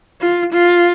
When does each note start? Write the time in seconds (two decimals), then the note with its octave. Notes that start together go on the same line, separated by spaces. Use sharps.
0.21 F4
0.53 F4